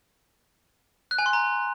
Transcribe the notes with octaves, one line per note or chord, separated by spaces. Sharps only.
F#6
G#5
C6
A#5